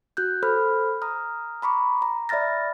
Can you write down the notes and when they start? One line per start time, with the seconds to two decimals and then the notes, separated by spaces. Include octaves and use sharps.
0.17 F#4 F#6 G6
0.43 A4 C5 B5 F6
1.02 A#5 D#6 F6
1.62 A#5 B5 C#6 D6
2.02 A#5
2.29 D5 E5 B5 F6 A6 A#6